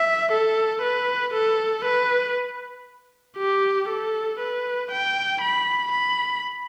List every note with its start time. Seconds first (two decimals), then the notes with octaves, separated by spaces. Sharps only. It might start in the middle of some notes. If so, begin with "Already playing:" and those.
Already playing: E5
0.32 A4
0.82 B4
1.34 A4
1.85 B4
3.37 G4
3.88 A4
4.40 B4
4.91 G5
5.41 B5
5.92 B5